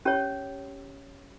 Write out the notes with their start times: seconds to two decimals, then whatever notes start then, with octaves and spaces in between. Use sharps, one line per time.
0.05 C#4 G4 C#5